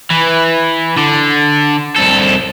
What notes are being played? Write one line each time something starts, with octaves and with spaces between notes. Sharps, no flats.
E3
D3
C2 A4